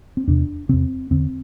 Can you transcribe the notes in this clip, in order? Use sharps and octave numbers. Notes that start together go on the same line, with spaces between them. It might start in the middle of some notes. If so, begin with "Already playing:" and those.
C4
E2 C3 D4
E2 C3 C4
E2 D3 C4